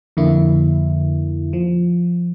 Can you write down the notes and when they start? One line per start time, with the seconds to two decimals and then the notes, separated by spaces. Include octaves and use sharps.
0.17 F2 D3 A#3 E4
1.53 F3